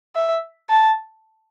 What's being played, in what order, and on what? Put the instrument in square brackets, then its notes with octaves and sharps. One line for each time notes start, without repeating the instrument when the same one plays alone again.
[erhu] E5
A5